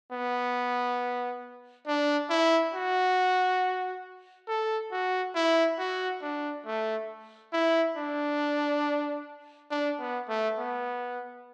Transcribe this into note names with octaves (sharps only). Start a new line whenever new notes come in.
B3
D4
E4
F#4
A4
F#4
E4
F#4
D4
A3
E4
D4
D4
B3
A3
B3